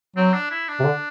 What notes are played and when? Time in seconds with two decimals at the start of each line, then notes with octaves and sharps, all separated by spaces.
0.16 F#3 C4
0.33 D4
0.51 E4
0.68 D4
0.80 C3
0.85 D3